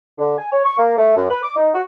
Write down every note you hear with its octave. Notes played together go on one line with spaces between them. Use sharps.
D3
G#5
C#5
C#6
A#3
A3
F#2
B4
D6
D#4
F#4